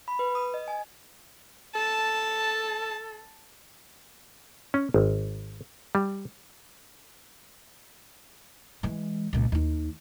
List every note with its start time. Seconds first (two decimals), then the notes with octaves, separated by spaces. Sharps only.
0.08 B5
0.19 B4
0.35 D#6
0.54 D#5
0.68 G#5
1.76 A4 A5
4.74 C#4
4.94 G#1
5.95 G3
8.83 E3 G#3
9.33 C#2 A#2
9.52 D#2 D#4